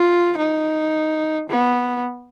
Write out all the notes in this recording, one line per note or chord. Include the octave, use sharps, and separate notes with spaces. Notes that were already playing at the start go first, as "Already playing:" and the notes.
Already playing: F4
D#4
B3